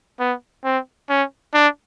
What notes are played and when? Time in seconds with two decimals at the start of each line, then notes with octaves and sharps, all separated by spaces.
0.20 B3
0.64 C4
1.09 C#4
1.54 D4